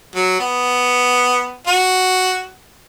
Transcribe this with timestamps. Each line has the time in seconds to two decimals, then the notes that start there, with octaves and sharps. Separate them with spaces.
0.15 F#3
0.40 B3
1.67 F#4